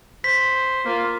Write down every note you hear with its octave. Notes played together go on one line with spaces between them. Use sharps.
C5 B6
A#3 F4